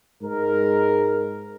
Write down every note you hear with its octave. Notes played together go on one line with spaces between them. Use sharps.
G#2 G#3 A#4